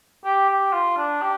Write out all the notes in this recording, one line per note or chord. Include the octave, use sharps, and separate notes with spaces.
G4
G4
F4
D4
G4